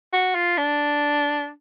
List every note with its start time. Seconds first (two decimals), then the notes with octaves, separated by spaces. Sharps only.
0.13 F#4
0.35 F4
0.57 D4